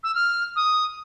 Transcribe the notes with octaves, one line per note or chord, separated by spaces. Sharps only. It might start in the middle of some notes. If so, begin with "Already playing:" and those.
E6
F6
D#6